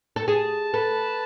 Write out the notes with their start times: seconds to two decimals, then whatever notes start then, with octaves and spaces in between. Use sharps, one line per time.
0.16 A4
0.27 G#4 A5
0.73 A4 B4